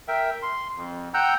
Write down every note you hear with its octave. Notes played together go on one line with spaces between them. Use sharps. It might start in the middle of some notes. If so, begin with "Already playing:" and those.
A#4 E5 G5
C6
F2
F#5 G5 A#5 E6 F#6 G6